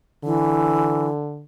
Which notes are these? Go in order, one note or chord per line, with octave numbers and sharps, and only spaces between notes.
D3 E3